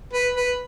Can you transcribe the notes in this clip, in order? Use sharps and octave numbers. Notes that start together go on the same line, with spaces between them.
B4
B4